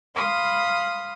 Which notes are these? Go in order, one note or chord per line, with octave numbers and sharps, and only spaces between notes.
F5 B5 C6 D#6 F6